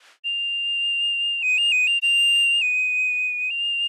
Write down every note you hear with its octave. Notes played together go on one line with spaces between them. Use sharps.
F7
D#7
F7
D#7
F7
F7
D#7
F7